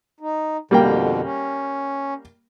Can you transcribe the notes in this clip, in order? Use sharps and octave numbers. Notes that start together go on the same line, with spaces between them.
D#4
F2 B2 D3 G3 A#3 G5
C#4